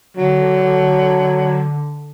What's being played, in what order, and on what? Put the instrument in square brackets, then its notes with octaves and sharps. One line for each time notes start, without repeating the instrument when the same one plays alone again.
[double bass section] D3 [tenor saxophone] F#3